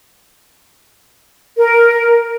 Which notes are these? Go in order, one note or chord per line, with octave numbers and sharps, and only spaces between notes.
A#4